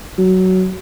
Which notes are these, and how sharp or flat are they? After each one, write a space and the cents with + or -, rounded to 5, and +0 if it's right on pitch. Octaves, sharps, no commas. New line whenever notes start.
F#3 +10